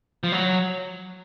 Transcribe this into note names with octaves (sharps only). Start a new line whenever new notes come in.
F3
F#3